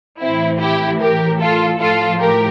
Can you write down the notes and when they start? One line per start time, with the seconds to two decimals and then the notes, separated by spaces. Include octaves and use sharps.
0.21 A2 E3 C4 E4
0.60 E4 G4
1.00 G4 A#4
1.40 F4 A4
1.79 A2 F3 F4 A4
2.20 G4 A#4